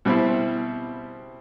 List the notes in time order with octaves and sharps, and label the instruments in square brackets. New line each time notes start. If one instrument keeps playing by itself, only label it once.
[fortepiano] B2 G3 C4 E4